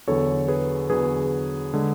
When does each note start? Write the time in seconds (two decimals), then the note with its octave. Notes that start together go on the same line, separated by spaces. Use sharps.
0.07 E2 D3 F#3 A4 C#5
0.48 G#4 B4
0.90 E2 D3 F#3 G#4 B4
1.73 D3 G#3